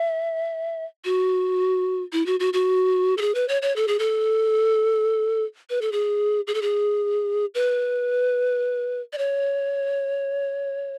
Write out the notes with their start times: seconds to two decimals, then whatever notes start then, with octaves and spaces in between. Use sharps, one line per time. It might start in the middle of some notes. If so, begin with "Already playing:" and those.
Already playing: E5
1.05 F#4
2.13 E4
2.26 F#4
2.40 F#4
2.53 F#4
3.18 A4
3.21 G#4
3.35 B4
3.48 C#5
3.62 C#5
3.76 A4
3.88 G#4
3.99 A4
5.70 B4
5.81 A4
5.92 G#4
6.47 G#4
6.54 A4
6.62 G#4
7.55 B4
9.13 D5
9.18 C#5